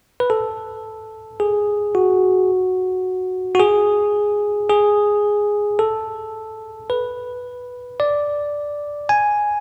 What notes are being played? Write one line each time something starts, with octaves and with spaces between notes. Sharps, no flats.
B4
A4
G#4
F#4
F#4
G#4
G#4
A4
B4
D5
G#5